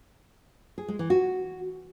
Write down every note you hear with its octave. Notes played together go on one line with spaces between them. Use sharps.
G#4
G#3
E3
F#4